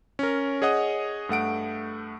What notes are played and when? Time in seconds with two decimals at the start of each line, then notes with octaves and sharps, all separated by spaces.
0.19 C#4 A#4
0.62 G#4 C#5 D#5 F#5 D#6
1.29 G2 A3 F#5 D7